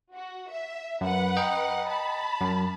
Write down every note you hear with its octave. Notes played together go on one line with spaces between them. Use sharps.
F#4
E5
F#2 B4 F#5
D#5 G5 A#5
A5 B5
F#2